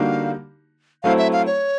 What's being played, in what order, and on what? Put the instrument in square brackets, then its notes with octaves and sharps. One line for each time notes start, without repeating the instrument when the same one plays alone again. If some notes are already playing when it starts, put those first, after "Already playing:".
Already playing: [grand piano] D3 G3 A#3 D#4 F#4 [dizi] F5
[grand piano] F#3 A3 C4 E4 [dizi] F5
[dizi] E5
F5
C#5